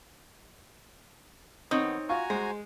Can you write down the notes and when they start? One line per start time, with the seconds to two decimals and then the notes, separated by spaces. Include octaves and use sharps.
1.71 D#3 B3 C4 D#4 C#5 D#6
2.09 F4 F#4 F5 G#5 A#5 C#6
2.30 G#3 C5